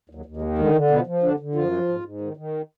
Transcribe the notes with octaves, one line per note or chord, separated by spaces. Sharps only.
D#2
F#3
D#2
G#3
D#3
D3 G#3
D3
B2 F3 B3
F3
D3 D4
D3
F#2 F3 F4
F3
G#2
G#2
D#3
D#3